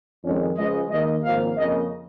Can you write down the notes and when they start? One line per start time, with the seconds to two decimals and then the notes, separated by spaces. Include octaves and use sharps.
0.24 F2 D#3 G#3 C#4
0.57 C#2 C#3 F3 G#3 D#5
0.90 D#2 D#3 A#3 D#5
1.24 G#1 G#2 F3 A#3 F5
1.56 F2 C#3 A#3 D#5